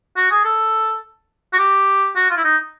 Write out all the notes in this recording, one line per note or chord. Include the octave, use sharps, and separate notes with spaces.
F#4
G#4
A4
F#4
G4
F#4
F4
E4
D#4